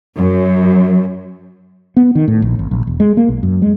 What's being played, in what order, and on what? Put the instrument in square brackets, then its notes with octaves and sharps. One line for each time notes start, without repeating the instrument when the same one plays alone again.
[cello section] F#2
[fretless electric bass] B3
D#3
A2
A#1
G#1
A#1
E1
G#3
A#3
B1
F#2
G#3